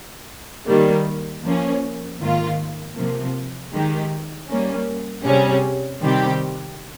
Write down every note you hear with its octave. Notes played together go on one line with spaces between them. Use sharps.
D#3 G3 A#3
F3 A#3 C#4
G#2 D#3 A#3 F4
C3 F3 A#3
D#3 G#3 D#4 G4
G3 A#3 C#4
C3 G3 C#4 G#4
C3 D#3 G3 C4 G4